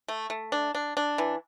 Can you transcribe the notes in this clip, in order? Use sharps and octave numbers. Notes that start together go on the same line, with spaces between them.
A3
A3
D4
D4
D4
E3